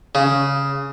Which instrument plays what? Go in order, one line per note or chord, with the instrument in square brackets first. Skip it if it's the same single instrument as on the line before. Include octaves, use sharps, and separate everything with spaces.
[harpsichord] C#3